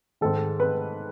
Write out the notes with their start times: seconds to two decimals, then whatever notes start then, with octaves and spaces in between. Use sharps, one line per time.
0.21 G#2 D#3 A4
0.60 B4